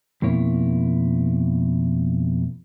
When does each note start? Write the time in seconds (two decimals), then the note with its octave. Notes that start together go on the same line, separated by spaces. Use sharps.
0.22 F2 B2 A#3 E4 C#5